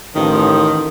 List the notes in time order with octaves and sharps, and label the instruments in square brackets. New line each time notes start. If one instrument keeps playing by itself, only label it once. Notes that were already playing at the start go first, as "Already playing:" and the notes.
[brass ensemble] A1 F3 [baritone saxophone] D#3